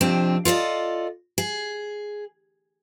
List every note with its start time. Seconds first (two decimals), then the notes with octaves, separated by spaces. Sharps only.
0.01 F2 C3 C4 D4
0.45 F4 A4 D5 D#5
1.38 G#4